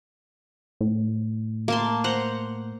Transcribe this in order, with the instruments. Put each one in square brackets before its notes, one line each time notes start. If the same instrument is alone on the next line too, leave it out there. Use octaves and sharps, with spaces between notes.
[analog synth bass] A2
[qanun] A#3 A5 C6
C5 F#5 A#5